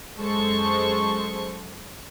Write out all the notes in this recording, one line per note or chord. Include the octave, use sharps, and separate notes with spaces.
F#2 G#3 A4 C5 C#6